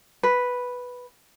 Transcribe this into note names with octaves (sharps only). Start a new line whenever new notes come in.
B4